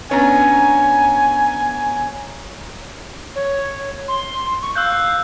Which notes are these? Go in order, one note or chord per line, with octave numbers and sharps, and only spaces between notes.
B3 C#4 D4 C#5 G#5 A#5
C#5
C6
C#6
F5 E6 F#6 G6